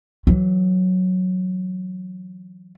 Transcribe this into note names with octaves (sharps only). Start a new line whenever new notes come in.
E3 F#3